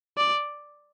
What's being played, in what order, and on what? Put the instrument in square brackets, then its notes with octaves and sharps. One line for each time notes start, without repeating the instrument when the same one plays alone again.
[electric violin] D5